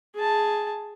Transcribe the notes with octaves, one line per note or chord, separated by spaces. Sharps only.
G#4 A5